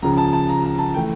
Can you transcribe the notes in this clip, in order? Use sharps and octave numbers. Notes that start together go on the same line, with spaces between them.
C#2 C#3 F3 A#5
A5
A5
A#5
A#5
A5
E3 A3 G5